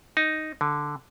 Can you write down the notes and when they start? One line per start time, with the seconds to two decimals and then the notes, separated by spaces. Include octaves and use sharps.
0.17 D#4
0.61 D3